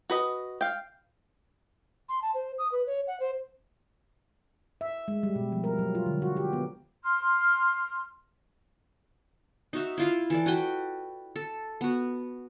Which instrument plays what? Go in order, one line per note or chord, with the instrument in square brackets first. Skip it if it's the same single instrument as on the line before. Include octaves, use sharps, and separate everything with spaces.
[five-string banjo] F#4 B4 D#5
F5 G5
[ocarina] C6
A5
C5
D#6
B4
C#5
F#5
C5
[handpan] E5
G#3
G3
B2
F3
A#4
F#3
F4
D3
F#4
G4
B3
[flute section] C6 F6
[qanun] D#4 F#4 E5
E4 F4 F5
E3 A4 D5
F#4 B4 G5
A4
B3 F#4